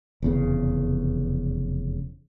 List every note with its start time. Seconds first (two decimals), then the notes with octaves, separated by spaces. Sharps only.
0.22 F1 E2 C#3